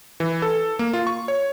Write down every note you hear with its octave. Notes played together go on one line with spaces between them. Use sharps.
E3
A4
A#3
F4
C#6
C#5